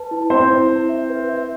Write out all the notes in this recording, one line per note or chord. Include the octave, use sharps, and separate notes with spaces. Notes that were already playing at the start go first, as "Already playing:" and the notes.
Already playing: B4 A5
E4
C4 E4 C5
E4
E4
E5
B4
E5